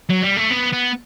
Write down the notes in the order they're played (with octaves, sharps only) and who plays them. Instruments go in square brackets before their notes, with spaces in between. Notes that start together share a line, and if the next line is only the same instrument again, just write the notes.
[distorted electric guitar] F#3
G3
A3
B3
B3